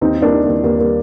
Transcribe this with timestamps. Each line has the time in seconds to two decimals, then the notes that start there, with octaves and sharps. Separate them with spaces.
0.01 D#2 C4 D#4
0.17 G3
0.22 A#3 D4
0.33 D#3
0.43 A#3
0.48 D#2
0.63 D#2 A#3
0.79 G3 A#3